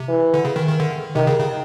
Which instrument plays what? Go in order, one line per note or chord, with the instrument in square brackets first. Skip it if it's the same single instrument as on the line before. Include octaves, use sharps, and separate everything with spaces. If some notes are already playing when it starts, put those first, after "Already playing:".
Already playing: [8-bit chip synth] C3
[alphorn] E3
[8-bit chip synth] D3
C#3
D#3
D#3
D3
[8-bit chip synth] C3 [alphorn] D#3
[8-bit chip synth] C#3
C#3